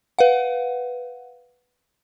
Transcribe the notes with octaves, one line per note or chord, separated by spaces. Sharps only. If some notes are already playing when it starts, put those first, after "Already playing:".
B4 F5 F#5